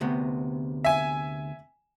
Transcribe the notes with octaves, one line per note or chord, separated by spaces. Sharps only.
D2 C3 B3
E5 G#5